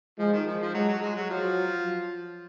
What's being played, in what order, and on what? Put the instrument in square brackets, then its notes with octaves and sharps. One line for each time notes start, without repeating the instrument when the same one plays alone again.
[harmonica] F3 [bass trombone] G#3
[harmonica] D#3
F3
F3
[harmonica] F#3 [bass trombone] G#3
[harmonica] F#3
G#3
F#3
[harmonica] F3 [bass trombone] F#3